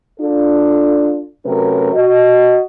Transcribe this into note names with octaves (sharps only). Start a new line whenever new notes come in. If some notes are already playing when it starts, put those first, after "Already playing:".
D4 F4 A4
C3 F#3 A3 C#4 A#4 B4
F#4 D#5